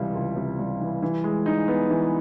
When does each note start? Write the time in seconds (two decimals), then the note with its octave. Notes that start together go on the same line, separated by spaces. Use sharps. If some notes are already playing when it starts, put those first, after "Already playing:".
Already playing: C#2 C3 E3 G3
0.15 C#2
0.36 C3
0.59 G3
0.80 E3
1.02 E3
1.24 G#3
1.46 D#4
1.68 B3
1.90 E3